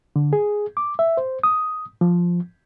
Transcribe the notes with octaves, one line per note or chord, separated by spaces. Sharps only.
D3
G#4
D6
E5
C5
D#6
F3